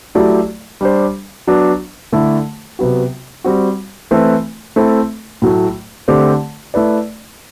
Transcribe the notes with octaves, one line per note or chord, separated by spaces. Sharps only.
F#3 A3 E4 G4 D5
G3 D4 G4 C5
F#3 B3 D4
D3 A3 E4
C3 F#3 B3 F#4
G3 C4 F#4
E3 A3 C4 E4 B4
A3 C4 E4 A4
A2 F#3 A3
D3 A3 C4 G4 D5
A3 E4 B4 D5